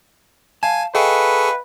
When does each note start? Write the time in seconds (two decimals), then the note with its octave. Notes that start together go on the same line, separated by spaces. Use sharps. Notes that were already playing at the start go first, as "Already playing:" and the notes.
0.63 F5 G#5 A5
0.95 G#4 A4 B4 D#5 F5 G5 C#6